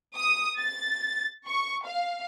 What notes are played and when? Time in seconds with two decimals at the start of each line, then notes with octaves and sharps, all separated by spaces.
0.16 D#6
0.58 A6
1.47 C#6
1.86 F5